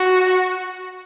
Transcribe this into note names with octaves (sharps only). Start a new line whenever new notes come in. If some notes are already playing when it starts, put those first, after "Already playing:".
Already playing: F#4